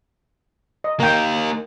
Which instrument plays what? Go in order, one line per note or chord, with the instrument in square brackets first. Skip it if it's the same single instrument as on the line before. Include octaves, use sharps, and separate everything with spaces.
[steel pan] D#5
[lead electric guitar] A#3 D#4 [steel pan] A#4 G5